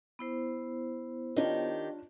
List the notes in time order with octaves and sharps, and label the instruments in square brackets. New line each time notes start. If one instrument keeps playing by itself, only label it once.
[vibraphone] B3 E4 C5
[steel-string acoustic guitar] D#3 G4 [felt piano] D4 F4 C#5